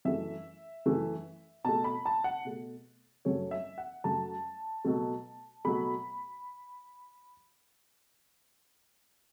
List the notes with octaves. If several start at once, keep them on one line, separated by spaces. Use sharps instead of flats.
F#2 E3 A3 E5
F#2 E3 A3
B2 A3 A5
B5
A5
F#5
B2 A3
F#2 F#3 A3 C#5
E5
F#5
F#2 F#3 A3 A5
B2 F#3 A3
B2 F#3 A3 B5